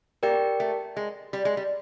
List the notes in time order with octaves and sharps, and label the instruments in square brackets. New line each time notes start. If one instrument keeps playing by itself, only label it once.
[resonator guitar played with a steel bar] A#3 [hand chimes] G4 A#4 D5 G5
[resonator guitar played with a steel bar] A3
G#3
G3
G#3
G3